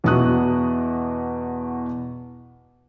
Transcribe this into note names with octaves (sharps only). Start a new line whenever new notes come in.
E2 B2 E4 F#4 D#6 F#6